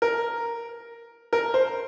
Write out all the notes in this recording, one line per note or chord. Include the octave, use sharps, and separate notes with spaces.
A#4
A#4
C5